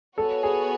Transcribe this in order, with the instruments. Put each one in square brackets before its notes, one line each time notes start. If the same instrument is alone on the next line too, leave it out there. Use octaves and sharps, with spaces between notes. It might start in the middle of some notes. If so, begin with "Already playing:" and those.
[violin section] B3 F#4 C#5 G#5 [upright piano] A4
[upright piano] G#4